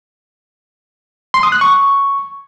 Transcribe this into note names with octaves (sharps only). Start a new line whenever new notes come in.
C6
D#6
F#6
C#6